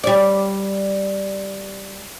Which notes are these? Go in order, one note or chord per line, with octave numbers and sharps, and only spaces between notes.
G3 D5